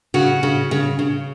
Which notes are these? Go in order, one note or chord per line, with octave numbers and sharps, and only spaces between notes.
C#3 F#4
C#3
C#3
C#3